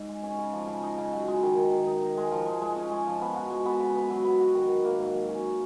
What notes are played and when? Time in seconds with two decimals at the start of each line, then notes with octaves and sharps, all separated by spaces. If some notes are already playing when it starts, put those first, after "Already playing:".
Already playing: G#2
0.09 G#3
0.23 C#4
0.38 C#3
0.53 F3
0.67 C#3
0.83 D#4
0.98 C#3
1.13 F#3
1.28 G#3
1.43 D#3
1.57 D#3
1.72 D#3
1.87 D#4
2.02 D#4
2.17 G#3
2.32 F3
2.46 G#3
2.61 G#3
2.76 C#4
2.91 G#3
3.07 F3
3.21 B3
3.36 F#4
3.50 G#3
3.65 B3
3.80 C#3
3.95 B3
4.10 F#3
4.24 B3
4.40 F#4
4.55 D#3
4.69 F#3
4.85 A#3
5.00 G#2
5.14 F#3
5.29 C#4